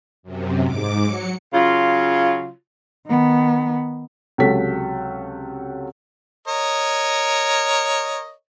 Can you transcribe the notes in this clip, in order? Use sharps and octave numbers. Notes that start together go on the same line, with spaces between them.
F#2 C3
G#2 D6
F#3 C#7
C#3 F#3 F4
D#3 B3
C#2 C3 F#3 C#4 A4 B6
A#4 C#5 D#5